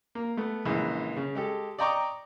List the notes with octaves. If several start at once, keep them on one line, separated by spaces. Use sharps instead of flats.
A#3
A3 B3
A#1 C#3 E3 G#3
C#3
G#3 G4 A4
D5 D#5 G5 A#5 C#6 D6